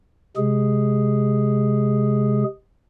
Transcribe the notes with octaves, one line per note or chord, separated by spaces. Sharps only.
C3 G#3 G#4